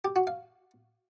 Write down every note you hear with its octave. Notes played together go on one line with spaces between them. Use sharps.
G4
F#4
F5